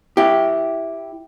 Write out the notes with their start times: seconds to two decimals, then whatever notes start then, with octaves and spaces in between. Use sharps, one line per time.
0.17 E4 G4